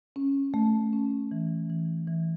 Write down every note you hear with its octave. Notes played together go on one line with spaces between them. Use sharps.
C#4
A3
C#4
E3
E3
E3